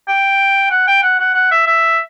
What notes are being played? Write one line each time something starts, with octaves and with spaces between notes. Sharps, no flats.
G5
F#5
G5
F#5
F#5
F#5
E5
E5